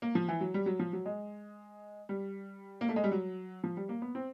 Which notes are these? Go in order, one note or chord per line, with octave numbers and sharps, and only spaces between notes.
A#3
F3
E3
F#3
G3
F#3
F3
F#3
G#3
G3
A#3
A3
G#3
G3
F#3
F3
G3
A#3
B3
C4